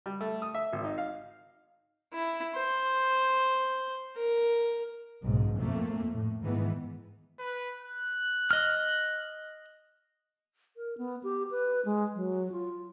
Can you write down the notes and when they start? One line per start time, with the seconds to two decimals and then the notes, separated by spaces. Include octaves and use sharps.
0.06 G3
0.21 A3
0.42 D#6
0.55 E5
0.73 G#1
0.84 D#4
0.98 F5
2.13 E4
2.55 C5
4.16 A#4
5.22 F#1 B1 G#2
5.58 F2 A3 A#3
6.12 A2
6.43 G#2 D#3 E3 B3
7.39 B4
7.81 F#6
8.51 D#5 F6
10.77 A#4
10.98 B3
11.23 G4
11.51 B4
11.85 G#3
12.15 F#3
12.52 F4